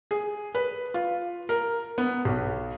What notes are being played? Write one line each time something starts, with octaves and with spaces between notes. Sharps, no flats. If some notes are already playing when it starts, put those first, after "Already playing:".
G#4
B4
F4
A#4
B3
B1